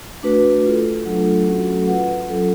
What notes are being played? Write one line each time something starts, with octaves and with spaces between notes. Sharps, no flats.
A3 D4 F#4 B4
A3 F4 A4
F#3 A3 D4 F4 A4
F#3 A3 C#4 F#4 A4
F4 B4 F#5
F#3 C#4 F4 A4